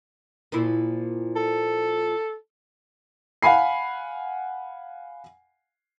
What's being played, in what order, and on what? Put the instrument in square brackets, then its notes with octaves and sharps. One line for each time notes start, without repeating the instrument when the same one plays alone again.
[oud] A#2 F3 E4
[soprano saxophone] A4
[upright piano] F5 F#5 G#5 B5 C7